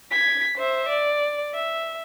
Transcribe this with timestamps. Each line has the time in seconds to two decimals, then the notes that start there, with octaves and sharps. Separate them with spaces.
0.11 G#6 B6
0.57 C5 E5
0.89 D5
1.54 E5